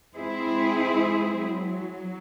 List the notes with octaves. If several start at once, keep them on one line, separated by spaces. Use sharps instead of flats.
G#3 C4 E4 G#4 C5
F#3